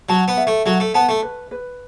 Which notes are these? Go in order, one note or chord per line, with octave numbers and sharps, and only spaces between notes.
F#3 A5
B3
E5
A3
F#3 A4
A3
B3 A5
A3
B4
B4